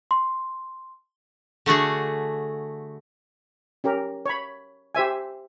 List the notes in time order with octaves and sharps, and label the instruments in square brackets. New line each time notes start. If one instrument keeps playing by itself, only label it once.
[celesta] C6
[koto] D3 A3 F#4 G#4
[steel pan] C#4 G4 A#4
C#5 B5
G4 C5 E5 G#5